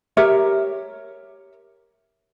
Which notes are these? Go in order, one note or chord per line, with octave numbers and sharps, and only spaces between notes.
G4 A#4 C#5 E5